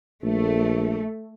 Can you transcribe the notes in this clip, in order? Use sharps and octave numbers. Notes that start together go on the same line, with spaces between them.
A#1 A3